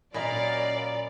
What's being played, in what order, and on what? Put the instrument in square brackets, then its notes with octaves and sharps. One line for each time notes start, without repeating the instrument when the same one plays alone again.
[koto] A#2 [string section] F#3 C#4 F5 [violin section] D5 [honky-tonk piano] D#5 A#5 B5